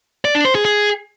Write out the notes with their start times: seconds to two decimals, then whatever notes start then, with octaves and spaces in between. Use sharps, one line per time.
0.25 D5
0.35 D4
0.45 C5
0.55 G#4
0.65 G#4